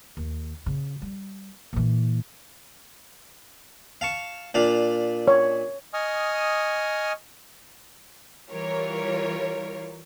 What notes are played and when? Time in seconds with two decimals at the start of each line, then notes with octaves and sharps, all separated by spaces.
0.17 D#2
0.66 C#3
1.02 G3
1.73 A#2 E3
4.01 F5 A5 C#6
4.54 A#2 D4 F5
5.28 C#5
5.94 D#5 G#5 C#6 D#6 F6
8.50 E3 G3 F4 A#4 C#5